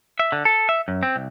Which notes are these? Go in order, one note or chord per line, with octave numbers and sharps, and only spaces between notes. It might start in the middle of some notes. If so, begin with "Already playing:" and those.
E5
D3
A4
E5
F#2
C4
C2